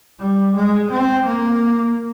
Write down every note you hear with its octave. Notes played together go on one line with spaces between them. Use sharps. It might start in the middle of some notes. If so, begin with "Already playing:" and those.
G3
G#3
C4
A#3